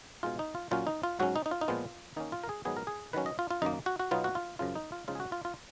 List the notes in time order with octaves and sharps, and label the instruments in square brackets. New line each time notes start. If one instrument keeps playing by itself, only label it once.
[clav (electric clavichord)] B2 G#3 D#4 F4
D#4
F4
A#2 F#3 C#4 F4
D#4
F4
G#2 F#3 C#4 F#4
D#4
D#4
F4
D#4
A#2 F3 G#3 B3 F4
D#3 A#3 C#4 D#4
F4
A#4
G#4
G#2 D#3 F#3 B3 G#4
A#4
G#4
D#3 F#3 C#4 B4
D#5
F4
F4
F#2 D#3 A#3 D#4
F#4
F#4
B2 F#3 B3 D#4 F4
F#4
F4
F#2 C#3 F3 F4
D#4
F4
C#3 F3 G#3 D#4 F4
G#4
F#4
F4
F4